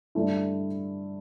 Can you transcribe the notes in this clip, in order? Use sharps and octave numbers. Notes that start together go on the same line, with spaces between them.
G2 D3 A3 E4